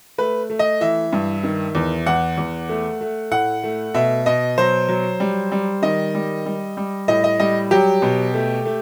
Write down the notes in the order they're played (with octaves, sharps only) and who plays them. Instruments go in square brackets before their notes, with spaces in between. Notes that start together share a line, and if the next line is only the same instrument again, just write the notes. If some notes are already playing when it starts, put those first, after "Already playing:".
[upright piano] A3 B4
A3
D#5
E3 E5
G2
D#3
E2
E2 F#5
E2
A3
A3
A2 F#5
A3
B2 E5
B2 D#5
F#3 C5
F#3
G3
G3
D#3 D#5
G3
G3
G3
A2 D#5
D#5
G3 D#5
F#3 G4
B2
A3
A3